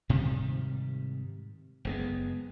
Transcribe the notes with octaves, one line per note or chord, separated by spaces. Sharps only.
G#2 C3 D#3 G3
F#1 G#3 B3